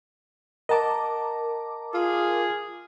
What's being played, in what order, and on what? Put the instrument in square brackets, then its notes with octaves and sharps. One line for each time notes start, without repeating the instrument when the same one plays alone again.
[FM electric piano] A#4 A#5 D6 [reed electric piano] D#5 F#5 A5
[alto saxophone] F4 [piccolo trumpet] G#4